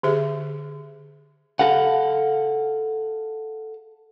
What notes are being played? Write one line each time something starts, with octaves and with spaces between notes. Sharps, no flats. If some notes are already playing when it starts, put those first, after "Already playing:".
D3 G4 G#4 E5
A4 F5 F#5